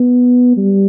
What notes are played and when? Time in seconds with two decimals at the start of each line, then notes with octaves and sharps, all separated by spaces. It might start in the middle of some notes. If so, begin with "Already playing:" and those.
Already playing: B3
0.57 G3